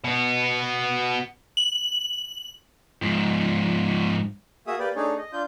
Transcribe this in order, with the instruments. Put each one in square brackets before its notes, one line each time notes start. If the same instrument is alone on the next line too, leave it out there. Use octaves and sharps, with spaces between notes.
[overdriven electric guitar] B2 B3
[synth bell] F#7
[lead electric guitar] G#2 F3
[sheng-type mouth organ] A#3 F#4 G#4 E5 D#6
A#3 G4 B4 D5
A3 D4 D#4 G#4 C#5
D#5
D4 F4 G6